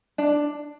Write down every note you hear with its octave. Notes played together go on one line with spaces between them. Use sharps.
D4